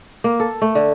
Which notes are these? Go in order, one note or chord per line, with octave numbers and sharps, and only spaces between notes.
A#3
A4
A3
D3